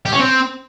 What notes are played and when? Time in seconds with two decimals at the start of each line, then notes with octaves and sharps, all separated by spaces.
0.06 G4
0.13 C#4
0.19 C4